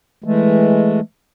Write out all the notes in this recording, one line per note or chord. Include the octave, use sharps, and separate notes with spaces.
E3 G#3 A3